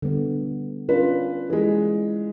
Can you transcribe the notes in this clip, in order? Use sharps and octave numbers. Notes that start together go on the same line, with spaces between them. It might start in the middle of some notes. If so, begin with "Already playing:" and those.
D3 G3 B3
C#4 D4 F4 B4
E3 G#3